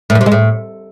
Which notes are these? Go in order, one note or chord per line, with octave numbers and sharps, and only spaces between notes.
A2
F#2
C3
G#3
A2